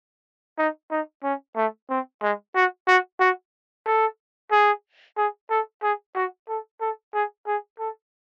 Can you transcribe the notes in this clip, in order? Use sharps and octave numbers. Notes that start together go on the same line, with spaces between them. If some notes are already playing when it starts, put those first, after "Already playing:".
D#4
D#4
C#4
A3
C4
G#3
F#4
F#4
F#4
A4
G#4
G#4
A4
G#4
F#4
A4
A4
G#4
G#4
A4